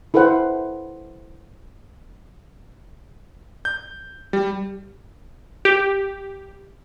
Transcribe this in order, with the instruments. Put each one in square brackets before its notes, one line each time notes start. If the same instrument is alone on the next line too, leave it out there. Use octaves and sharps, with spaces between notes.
[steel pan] E4 A4 B4 C5 F#5
[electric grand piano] G6
G3
[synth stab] G4